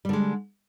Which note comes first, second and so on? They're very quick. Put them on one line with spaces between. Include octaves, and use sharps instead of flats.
G3 D3 G#3